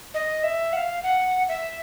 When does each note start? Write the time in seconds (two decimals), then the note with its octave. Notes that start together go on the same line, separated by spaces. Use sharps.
0.14 D#5
0.43 E5
0.73 F#5
0.76 F5
1.03 F#5
1.49 E5